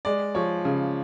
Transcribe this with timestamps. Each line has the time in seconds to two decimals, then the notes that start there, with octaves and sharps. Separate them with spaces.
0.05 G#3 D5
0.35 F3 C#5
0.65 C#3